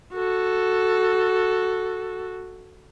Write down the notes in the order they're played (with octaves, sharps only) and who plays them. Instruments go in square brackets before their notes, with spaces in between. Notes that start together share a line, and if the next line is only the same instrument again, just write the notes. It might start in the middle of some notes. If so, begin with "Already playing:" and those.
[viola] F#4 A4